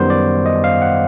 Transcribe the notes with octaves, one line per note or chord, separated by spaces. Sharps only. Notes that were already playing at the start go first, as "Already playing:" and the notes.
Already playing: F#2 D#3 G3 B3 C5
D5
D#5
F5
F#5